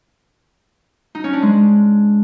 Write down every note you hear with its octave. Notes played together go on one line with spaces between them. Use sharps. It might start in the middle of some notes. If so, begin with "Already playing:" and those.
D#4
C#4
D4
G#3